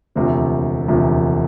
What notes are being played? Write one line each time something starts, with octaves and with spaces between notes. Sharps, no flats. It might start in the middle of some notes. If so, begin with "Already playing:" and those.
E1 D2 C3 F3
E1 D2 C3 F3